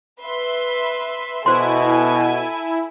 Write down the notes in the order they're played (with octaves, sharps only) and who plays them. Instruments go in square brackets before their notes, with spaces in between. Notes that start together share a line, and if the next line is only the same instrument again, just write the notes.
[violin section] B4 E5 C6
[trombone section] B2 [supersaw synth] E4 [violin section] A4 G#5 [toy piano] C5 C6